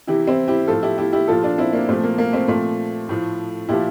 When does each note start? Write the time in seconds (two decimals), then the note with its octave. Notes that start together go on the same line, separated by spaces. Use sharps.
0.07 C3 E3 E4 G4
0.27 C4 E4
0.48 E4 G4
0.68 A2 F3 F4 A4
0.83 E4 G4
0.98 E4 G4
1.13 E4 G4
1.28 A#2 F3 F4 A4
1.43 D4 F4
1.58 C4 E4
1.73 A#3 D4
1.88 A#2 F3 A3 C4
2.03 A#3
2.18 A#3
2.33 A3 C4
2.48 A#2 F3 A3 C4
3.09 A2 F3
3.69 A#2 F3 E4 G4